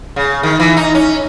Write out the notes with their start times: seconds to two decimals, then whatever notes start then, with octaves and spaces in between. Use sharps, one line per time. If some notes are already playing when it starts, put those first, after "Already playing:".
0.16 C#3
0.43 D#3
0.60 E3
0.77 D#4
0.95 C#4